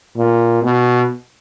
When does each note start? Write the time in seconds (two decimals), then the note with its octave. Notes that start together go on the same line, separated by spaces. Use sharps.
0.16 A#2
0.63 B2